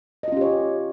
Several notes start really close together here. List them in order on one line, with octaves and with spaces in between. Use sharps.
D#5 F4 C#4 G4 C#5